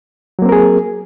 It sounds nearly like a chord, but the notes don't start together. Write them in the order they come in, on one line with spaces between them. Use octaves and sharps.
F#3 A#3 C4 A#4 G#4